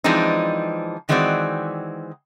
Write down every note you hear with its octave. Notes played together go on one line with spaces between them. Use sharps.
E3 F3 G#3 C4 D4 D#4
D#3 E3 G#3 C4 F#4 D5